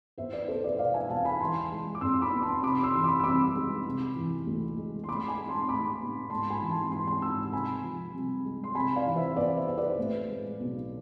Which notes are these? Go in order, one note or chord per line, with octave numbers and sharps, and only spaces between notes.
E2 C5 E5
B4 D5
B2 A4 C5
B4 D5
E1 D5 F5
E5 G#5
E1 F5 A5
G#5 B5
E3 A5 C6
G#3
D6
F2 C6 E6
B5 D6
B3
A5 C6
C3 B5 D6
C6 E6
E3 C6
B5 D6
E6
C2 B5 D6
G#3
C3
E3
D2
G#3
C6
A2 B5 D6
G#5 B5
G#3
A5 C6
A1 B5 D6
B3
G#2 A5 C6
G#5 B5
E3
A5 C6
G#1 A5 C6
A5 C6
G#1 C6 E6
C3 G#5 B5
F3
C2
G#3
C6
C3 G#5 B5
D5 F5
E3
C5 E5
E2 B4 D5
C5 E5
E2 C5
B4 D5
A2
G#3
B1